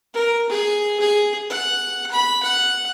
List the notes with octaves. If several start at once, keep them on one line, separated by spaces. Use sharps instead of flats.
A#4
G#4
G#4
F#5
B5
F#5